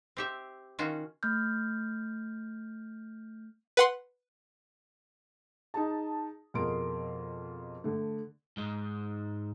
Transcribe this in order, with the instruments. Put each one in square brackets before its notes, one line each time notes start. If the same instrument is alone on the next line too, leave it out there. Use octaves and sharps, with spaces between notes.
[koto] C4 G4 E5
D#3 C#4 F4 F#4
[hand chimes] A3 F6 G6
[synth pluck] B4 F#5 C6
[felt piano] D#4 G#4 A5
F2 B2 G#4 A#4 C6 D7
D3 A3
[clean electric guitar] G#2 G#3